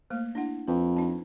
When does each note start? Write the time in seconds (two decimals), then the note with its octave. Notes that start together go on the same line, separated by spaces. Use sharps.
0.10 A3 A#3 C5
0.35 D4 E4 F#5
0.67 F2 B4
0.97 D4 D#4 A5